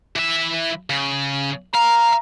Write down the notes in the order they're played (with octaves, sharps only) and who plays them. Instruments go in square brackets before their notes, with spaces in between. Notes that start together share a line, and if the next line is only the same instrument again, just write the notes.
[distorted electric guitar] E3 E5
C#3
[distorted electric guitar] F5 [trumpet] A#5